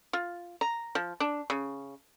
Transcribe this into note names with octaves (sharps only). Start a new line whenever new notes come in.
F4
A#5
F3
D4
C#3